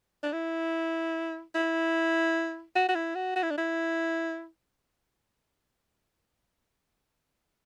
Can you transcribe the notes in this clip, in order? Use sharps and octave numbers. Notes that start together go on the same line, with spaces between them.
D4
E4
E4
F#4
F#4
E4
F#4
F#4
E4
D4
E4